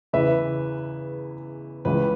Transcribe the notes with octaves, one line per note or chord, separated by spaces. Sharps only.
E2 C#3 E3 B4 E5
C#2 C#3 E3 B4